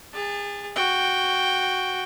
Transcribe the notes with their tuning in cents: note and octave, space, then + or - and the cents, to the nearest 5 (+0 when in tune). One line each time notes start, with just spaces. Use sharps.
G#4 -35 A5 +0
F#4 +0 G5 +0